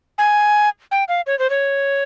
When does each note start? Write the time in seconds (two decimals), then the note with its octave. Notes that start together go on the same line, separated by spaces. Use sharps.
0.18 G#5
0.91 G5
1.08 F5
1.27 C#5
1.39 C5
1.50 C#5